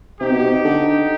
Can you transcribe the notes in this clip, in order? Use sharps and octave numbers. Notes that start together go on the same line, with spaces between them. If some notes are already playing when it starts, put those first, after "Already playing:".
C3 D#4 G4
B2
C3
D3